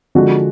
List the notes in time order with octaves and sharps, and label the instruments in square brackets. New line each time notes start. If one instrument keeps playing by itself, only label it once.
[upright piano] D3 F3 G#3 F#4